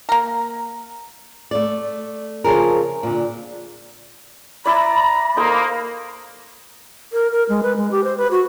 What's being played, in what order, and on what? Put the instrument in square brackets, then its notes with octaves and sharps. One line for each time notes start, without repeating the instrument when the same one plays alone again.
[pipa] A#3 A#4
[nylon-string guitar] A3 D5
C#3 F3 G#4 A#4
A#2 D3
[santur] E4 D5 [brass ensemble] A#5 [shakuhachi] B5
[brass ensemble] A#3 [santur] D#4 A4 C5
[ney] A#4
A#4
G#3
B4
G#3
G4
C5
B4
F#4